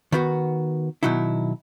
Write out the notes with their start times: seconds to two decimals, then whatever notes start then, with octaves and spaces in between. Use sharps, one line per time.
0.12 D#3 B3 F#4
1.03 B2 D#3 F#3 D#4 E4